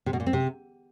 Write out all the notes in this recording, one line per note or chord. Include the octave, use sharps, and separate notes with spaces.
C3
B2
A#2
C4
C3